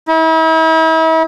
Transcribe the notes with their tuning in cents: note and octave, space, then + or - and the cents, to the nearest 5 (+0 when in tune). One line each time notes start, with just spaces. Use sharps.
E4 -40